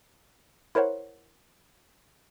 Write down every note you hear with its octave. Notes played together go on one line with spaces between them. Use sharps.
E4 A#4 C5 C#5 F#5